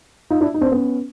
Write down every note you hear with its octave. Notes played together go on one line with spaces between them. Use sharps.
D#4 F4
D4 E4
D#4
C4 D4
B3 C#4